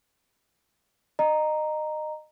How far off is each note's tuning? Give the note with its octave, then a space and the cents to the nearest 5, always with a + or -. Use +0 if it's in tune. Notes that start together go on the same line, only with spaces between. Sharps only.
D#5 -25 A#5 +0